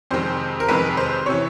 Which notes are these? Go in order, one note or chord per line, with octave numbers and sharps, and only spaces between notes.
F2 C3 D#3 G#3 C5
A#4
F2 C3 D#3 G#3 B4
C5
C3 E3 C#5